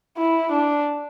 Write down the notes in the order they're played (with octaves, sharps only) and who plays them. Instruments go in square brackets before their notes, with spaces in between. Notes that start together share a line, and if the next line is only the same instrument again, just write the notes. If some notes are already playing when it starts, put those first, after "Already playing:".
[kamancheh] E4
D4